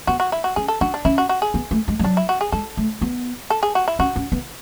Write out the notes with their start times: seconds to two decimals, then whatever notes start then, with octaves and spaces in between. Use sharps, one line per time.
0.07 B3 F#4
0.20 F#4
0.32 E4
0.44 F#4
0.56 C#4 G#4
0.68 A4
0.81 D4 F#4
0.94 D4
1.05 C#4 E4
1.18 F#4
1.29 F#4
1.42 G#4
1.54 B3
1.71 A3
1.88 G#3
1.99 G#3
2.04 F#3 D4
2.17 E4
2.29 F#4
2.41 G#4
2.52 G#3 A4
2.77 A3
3.02 B3
3.50 A4
3.63 G#4
3.75 F#4
3.88 E4
3.99 C#4 F#4
4.16 C#4
4.32 B3